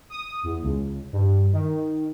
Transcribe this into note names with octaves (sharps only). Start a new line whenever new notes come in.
D#6
E2
C#2
G2
D#3